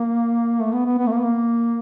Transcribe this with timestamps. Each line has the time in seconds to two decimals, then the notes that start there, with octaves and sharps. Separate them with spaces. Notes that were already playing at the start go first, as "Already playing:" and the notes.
Already playing: A#3
0.60 A3
0.73 B3
0.86 B3
0.98 B3
1.07 A3
1.11 A#3
1.18 B3
1.24 A#3